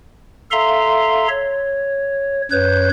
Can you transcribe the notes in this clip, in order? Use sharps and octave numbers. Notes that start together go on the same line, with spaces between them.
A4 E5 F5 A#5 C6
C#5
F#2 B4 C#5 G6